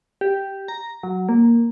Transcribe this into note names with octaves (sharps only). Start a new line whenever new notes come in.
G4
A#5
F#3
A#3